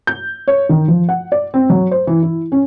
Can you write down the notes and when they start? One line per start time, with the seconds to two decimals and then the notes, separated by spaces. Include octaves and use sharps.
0.07 G6
0.48 C#5
0.69 D#3
0.88 F3
1.09 F#5
1.32 D5
1.54 C4
1.70 F#3
1.91 C5
2.07 E3
2.23 E4
2.52 C#4